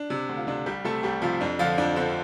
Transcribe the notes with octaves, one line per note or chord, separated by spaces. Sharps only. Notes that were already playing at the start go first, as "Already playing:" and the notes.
Already playing: D4
C3
D2
F4
C3 D4
C2 G3 G4
C3 A3 A4
C2 G3 G4
C3 F3 F4
F2 D4
D3 F3 F4
F2 D4
D3 C4